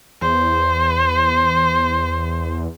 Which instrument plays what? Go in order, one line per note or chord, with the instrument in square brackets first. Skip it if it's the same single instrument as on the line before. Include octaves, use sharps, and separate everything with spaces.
[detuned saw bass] E2 [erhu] C5